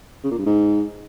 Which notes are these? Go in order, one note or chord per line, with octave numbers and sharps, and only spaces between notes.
C#3
A#2
G2
G#2